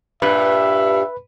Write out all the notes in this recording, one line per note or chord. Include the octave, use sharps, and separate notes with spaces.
G2 A#2 B4 E5 B5